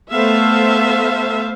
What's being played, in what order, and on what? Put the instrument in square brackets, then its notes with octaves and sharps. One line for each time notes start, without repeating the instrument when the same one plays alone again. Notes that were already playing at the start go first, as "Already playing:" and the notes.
[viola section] A3 B3 A4 C5 E5 F5